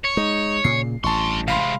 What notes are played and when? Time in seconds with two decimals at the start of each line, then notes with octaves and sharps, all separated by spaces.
0.04 C#5
0.17 G#3 D#4
0.64 A#2 C#3 C7
1.04 A1 G2 A5 C6 C#6
1.48 C3 G#3 F5 B5 C6